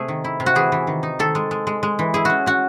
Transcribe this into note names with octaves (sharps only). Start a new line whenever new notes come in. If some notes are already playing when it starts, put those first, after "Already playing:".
Already playing: C3 A3 G#4
D#3
E4
C3
F#4
E3 G#4
E3
D#3
D#4
D#3 A4
G#3
G#3
G#3
G#3
E3
E4 G#4
C#4 F#4
C#4 F#4